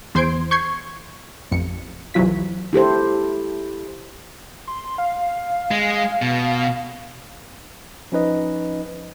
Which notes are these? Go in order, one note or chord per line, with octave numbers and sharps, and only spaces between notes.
E2 C5 C6 G#6 C7 D7
C#6 G6 G#6 C7
A1 F2 C#7
C2 F2 E3 F#3 F4 B6
E4 G4 A4 C5
C6
F5
G#3
B2
F3 C#4 D#4 B4 D#5